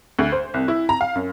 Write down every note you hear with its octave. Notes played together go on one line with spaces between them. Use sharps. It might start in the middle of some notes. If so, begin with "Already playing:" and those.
D2
C5
C2
E4
A#5
F5
F#2